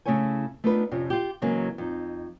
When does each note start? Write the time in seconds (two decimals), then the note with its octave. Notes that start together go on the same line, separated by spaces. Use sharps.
0.06 C#3 A3 E4 A4 C#5 G#5
0.64 A3 B3 D4 D#4 F4 B4
0.92 F2 C3 F3 C#4
1.10 F4 G4
1.42 C#3 E3 F#3 G#3 A#3 C#4
1.78 F2 D#4